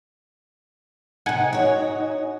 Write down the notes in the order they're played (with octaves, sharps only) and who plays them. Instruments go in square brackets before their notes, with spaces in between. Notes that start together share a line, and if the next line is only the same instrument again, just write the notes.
[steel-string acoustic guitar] C3 A#4 [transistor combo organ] D#4 [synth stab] F#5 G#5
[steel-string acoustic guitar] F#4 C#5